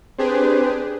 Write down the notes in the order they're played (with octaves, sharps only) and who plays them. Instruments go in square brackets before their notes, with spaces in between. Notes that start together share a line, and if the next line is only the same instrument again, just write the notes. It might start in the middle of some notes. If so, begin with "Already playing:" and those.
[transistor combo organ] C4 C5 [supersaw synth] D4 G4 G#4 [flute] B4